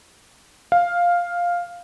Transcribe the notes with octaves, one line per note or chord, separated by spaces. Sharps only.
F5